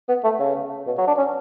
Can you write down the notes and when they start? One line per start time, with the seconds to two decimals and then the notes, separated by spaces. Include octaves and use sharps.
0.09 B3
0.24 A3
0.40 C#3
0.87 B2
0.98 F#3
1.08 D4
1.18 C#4